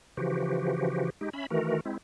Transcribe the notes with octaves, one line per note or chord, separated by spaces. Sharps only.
C#3 E3 F3 F#4 G4
G#3 D#4 G4
C#4 E5 B5
D#3 E3 A3 F#4 A#4
G#3 C4 E4